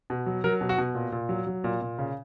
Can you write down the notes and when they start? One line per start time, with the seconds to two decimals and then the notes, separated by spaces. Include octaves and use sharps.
0.10 B2
0.26 F#3
0.44 F#3 A#4
0.61 B2
0.69 F#4
0.78 B2
0.95 A#2
1.12 A#2
1.29 F#3
1.47 F#3
1.64 A#2
1.81 A#2
1.98 C#3